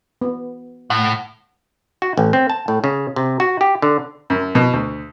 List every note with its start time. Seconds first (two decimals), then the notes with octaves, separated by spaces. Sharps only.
0.22 B3
0.90 A2 F#5
2.02 F#4
2.17 A1
2.33 C4
2.50 A5
2.68 A2
2.84 C#3
3.16 C3
3.40 F#4
3.61 G4
3.82 D3
4.30 F#2
4.55 B2
4.73 D2